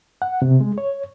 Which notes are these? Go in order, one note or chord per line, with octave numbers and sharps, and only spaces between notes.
F#5
C3
G#3
C#5